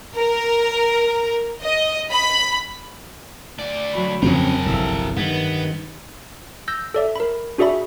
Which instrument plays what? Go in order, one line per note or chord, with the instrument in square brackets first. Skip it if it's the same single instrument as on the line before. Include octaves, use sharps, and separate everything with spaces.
[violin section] A#4
D#5
B5
[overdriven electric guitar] D2 D5
[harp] F#3 F#4 B5
[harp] G1 F2 [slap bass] C#3 F3 C4 [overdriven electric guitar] G#4 A#4
[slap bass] G1 C2 [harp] A4 E5 F5
[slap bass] G2 D#3 [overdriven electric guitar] B3
[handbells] E6 G6 A#6
A4 D5 E5
A#4 B5
D4 F#4 G#4 D5 E5 B5